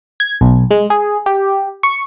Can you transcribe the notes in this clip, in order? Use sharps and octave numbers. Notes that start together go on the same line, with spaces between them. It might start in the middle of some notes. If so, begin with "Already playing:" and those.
G#6
B1
G#3
G#4
G4
C#6